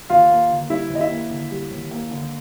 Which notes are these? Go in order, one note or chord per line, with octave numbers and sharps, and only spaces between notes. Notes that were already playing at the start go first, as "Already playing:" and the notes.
D#2 F4 F5
A#3
D3
G3 E4 E5
D#2
D#5
E4 E5
A#3
D3
G3
D#2
A#3
D3